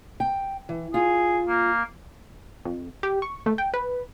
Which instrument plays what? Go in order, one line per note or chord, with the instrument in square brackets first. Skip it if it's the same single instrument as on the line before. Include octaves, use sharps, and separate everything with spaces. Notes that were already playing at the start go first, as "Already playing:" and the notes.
[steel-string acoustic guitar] G5
E3
[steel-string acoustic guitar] F4 [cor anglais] G#4
[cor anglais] A#3
[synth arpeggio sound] F2
G4
C#6
A3
G5
B4